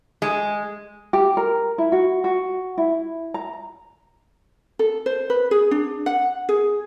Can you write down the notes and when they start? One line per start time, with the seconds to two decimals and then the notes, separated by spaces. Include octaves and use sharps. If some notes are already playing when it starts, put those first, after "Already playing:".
0.22 G#3
1.13 G4
1.37 A#4
1.78 E4
1.92 F#4
2.24 F#4
2.78 E4
3.34 A#5
4.79 A4
5.06 C5
5.30 B4
5.51 G#4
5.71 D4
6.06 F#5
6.49 G#4